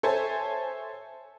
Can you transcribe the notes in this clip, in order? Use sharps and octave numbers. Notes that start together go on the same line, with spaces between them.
A4 C5 C#5 E5 G#5 A5